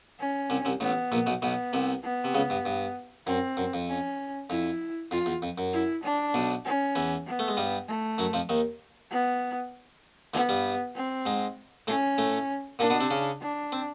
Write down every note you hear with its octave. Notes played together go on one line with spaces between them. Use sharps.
C#4
C2 C3
C2 C3
A1 A2 B3
A#1 A#2
B1 B2
B1 B2 B3
C2 C3
B3
C3
C#2 C#3
G2
G2
F#2 C4
F#2
F2
C#4
F2 E4
F2 F4
E2
F2
F#2
E4
D4
B1 B2
C#4
E2 E3
B3
A3
G#3
G2 G3
A3
F#2 F#3
F2 F3
D#2 D#3
B3
D2 D3 B3
G2 G3
C4
G#2 G#3
A2 A3 C#4
A2 A3
A#2 A#3 D4
B2 B3
C3 C4
C#3 C#4
D4
C4